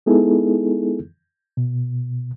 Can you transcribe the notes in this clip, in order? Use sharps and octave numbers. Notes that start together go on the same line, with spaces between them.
G#3 B3 D#4 E4 G#4 A4
B2